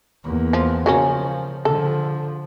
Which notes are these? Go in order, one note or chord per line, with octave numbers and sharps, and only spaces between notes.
E2 A#3
F3
C#3 F3 F#3 A#3 C#4
D3 F3 A4